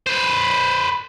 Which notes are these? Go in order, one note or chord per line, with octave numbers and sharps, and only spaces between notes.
B4 C5